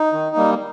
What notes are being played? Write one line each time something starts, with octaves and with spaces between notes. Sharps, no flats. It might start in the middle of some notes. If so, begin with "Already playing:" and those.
Already playing: D#4
D#3
G3 A#3